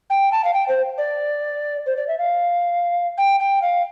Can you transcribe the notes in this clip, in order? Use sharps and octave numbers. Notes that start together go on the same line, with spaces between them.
G5
A5
F5
G5
C5
D5
C5
D5
E5
F5
G5
G5
F5